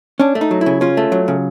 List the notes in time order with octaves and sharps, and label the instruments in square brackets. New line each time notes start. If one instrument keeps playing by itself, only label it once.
[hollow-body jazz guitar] C#4 D4
A3
D#4
F#3
E4
C#3
C#4 F4
A3
F#3
C#3